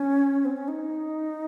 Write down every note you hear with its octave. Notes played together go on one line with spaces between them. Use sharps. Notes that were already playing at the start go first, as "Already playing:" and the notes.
Already playing: C#4
C4
C#4
D#4